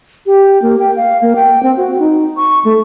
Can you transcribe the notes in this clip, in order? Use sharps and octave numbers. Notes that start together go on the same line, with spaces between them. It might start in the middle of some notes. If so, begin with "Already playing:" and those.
G4
A#3
G5
F5
A#3
G5
C4
F#4
D#4
C#6
A3